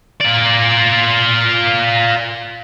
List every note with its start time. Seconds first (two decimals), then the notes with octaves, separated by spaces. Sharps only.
0.21 F4 D5